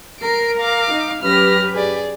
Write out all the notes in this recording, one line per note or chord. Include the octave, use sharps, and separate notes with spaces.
A#4 C7 D7
F5 D6
D#4
F#2 G4 B4 F6 A#6
G#4 D5